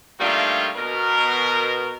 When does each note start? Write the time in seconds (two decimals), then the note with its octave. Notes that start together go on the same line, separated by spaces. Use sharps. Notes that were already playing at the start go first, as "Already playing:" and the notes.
0.19 G3 A3 A#3 D4 D#4 F4
0.76 B2 A#4